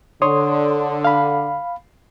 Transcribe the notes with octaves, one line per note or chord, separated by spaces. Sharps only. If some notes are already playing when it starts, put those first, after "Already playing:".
D3 C#5 C6 D#6
F5 B5